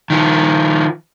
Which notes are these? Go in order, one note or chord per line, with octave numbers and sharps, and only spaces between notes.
D#3 F3